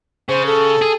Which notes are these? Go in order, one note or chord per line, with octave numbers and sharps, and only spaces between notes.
C#3 C5
A4
G#4